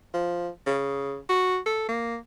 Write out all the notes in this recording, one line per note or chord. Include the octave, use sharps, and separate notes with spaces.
F3
C#3
F#4
A4
A#3